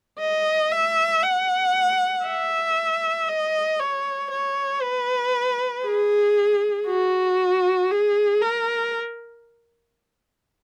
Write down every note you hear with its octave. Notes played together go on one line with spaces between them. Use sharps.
D#5
E5
F#5
E5
D#5
C#5
C#5
B4
G#4
F#4
G#4
A#4